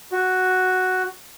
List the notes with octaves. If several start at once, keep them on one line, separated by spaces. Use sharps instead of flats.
F#4